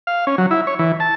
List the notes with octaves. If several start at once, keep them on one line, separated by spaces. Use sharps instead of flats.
F5
C#4
F#3
E4
C#5
E3
A5